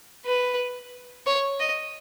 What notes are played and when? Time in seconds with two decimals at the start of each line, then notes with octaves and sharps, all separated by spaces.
0.26 B4
1.27 C#5
1.60 D#5